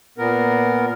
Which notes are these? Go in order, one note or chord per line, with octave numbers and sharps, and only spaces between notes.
A#2 B3 A#4